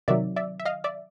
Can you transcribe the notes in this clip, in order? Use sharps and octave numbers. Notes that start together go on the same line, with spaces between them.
C3 D#3 F#3 D5 E5
D5 E5
E5
D#5 F5
D5 E5